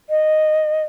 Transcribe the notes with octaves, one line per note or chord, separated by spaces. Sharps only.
D#5